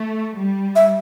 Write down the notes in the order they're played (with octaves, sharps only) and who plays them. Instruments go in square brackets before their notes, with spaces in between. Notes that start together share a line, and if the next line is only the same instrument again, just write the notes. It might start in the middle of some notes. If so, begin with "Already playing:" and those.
Already playing: [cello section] A3
G3
[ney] E5